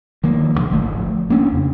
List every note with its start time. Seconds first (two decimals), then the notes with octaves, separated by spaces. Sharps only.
0.24 D#3 F3 A#3
0.55 A1 D2 B2 D3
0.70 D1 G#1 F3 A3
1.30 A#3 C#4 D4
1.52 F2 C#3